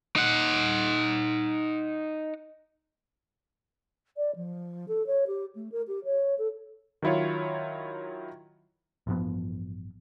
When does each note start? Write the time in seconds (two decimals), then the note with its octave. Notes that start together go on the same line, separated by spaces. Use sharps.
0.16 D#4 F#5
4.17 D5
4.36 F3
4.88 A4
5.07 C#5
5.27 G4
5.55 A3
5.72 A#4
5.88 G4
6.05 C#5
6.38 A4
7.02 D#3 F#3 E4 F4 C#5
9.07 A1 G2 F3 B3